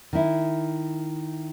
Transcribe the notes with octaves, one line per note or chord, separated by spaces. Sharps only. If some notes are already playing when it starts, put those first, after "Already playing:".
D#3 E4